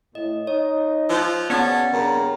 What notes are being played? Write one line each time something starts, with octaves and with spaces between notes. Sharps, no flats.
A2 D#5
D#4 C#5 D#5
F3 E6 F#6 G6
C#3 B3 C#4 F#4 D5 F#5 A5 A6
G2 C#3 A#4